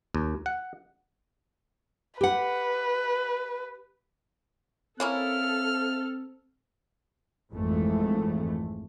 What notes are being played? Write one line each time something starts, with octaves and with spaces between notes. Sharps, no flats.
D#2
F#5
G4 B4 F#5
A#3 C4 C#4 E4 A4 F6
G#1 F2 E3 G#3 A3